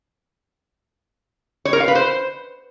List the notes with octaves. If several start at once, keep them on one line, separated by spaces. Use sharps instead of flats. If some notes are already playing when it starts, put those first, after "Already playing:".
C#5
A#4
F5
B4
C5